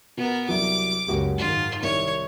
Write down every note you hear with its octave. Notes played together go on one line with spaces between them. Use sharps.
B2 B3 A#4
C2 F#3 D6
F#1 C#2 F#2 A#3 F#4 G4
G#2 D#3 F4
C2 C#5